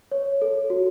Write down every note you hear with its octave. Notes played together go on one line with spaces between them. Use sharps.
C#5
A4
F#4